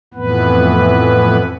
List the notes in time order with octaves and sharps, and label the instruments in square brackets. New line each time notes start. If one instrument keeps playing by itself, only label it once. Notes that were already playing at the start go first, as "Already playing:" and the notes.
[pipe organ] F2 A2 E3 B3 B4